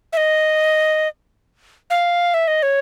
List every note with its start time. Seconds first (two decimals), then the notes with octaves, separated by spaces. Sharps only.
0.13 E5
0.17 D#5
1.90 F5
2.34 E5
2.48 D#5
2.63 C#5